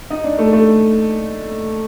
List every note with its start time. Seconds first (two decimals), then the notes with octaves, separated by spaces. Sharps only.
0.11 D#4
0.24 D4
0.38 A3
0.53 A3